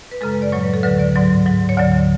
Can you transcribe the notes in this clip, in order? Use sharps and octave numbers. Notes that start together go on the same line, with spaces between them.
B4
F#2 C#3 G#3 A4
B4
D5
A2 F#3 C#5
B4
A4
D2 D3 F#3 B4
D5
G#2 F#3 D5
G#2 F#3
C#5
D2 D3 F#3 D5